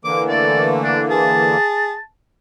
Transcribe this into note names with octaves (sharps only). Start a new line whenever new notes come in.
D3 E3 A#3 D6
A3 D5
D4
G#4 A5